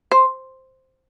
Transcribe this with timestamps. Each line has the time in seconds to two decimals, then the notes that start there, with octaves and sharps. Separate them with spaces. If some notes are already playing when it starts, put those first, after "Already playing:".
0.12 C5